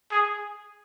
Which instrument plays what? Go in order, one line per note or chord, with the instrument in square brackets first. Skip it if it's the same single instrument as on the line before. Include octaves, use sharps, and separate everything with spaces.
[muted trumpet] G#4